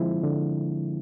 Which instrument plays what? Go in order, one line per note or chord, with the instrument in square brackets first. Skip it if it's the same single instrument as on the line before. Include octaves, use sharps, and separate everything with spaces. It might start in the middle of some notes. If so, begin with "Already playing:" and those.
Already playing: [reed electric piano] D3 F3 G#3 C4 E4
D3